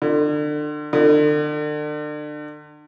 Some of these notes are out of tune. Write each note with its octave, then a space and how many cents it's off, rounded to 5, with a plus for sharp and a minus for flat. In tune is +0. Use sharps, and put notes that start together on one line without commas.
D3 +35
D3 +40